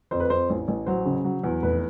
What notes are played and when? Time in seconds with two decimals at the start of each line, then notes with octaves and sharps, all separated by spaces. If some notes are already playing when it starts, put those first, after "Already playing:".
0.11 F2 C5
0.20 B4
0.30 F2 C5
0.50 A1
0.68 A1
0.86 F#3 C5
1.05 C#3
1.24 F#3
1.44 E2
1.63 F1 B4